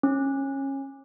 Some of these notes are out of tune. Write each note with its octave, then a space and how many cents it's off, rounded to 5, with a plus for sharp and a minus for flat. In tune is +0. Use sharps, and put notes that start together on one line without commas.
C#4 -20